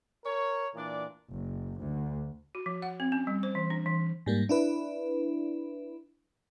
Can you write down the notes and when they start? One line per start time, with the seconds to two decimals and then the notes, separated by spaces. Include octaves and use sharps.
0.24 A#4 C#5
0.75 A#2 E3 D4 D5
1.32 F#1
1.80 D2
2.55 F#4
2.66 F3
2.82 F#5
3.00 C4
3.12 C#4
3.27 G3
3.43 C5
3.55 E3
3.70 D4
3.86 E3
4.26 G#2 G3 A#3
4.49 D4 E4 B4